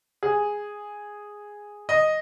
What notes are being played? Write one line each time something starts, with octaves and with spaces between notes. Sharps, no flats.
G#4
D#5